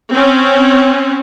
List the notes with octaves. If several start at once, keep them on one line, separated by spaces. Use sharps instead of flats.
C4 C#4